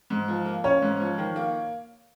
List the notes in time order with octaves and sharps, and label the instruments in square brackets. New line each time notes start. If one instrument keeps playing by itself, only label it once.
[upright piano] G#2
F3
A#3
[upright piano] C#4 [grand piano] C#5
[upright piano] G#2
F3
D#3
A#3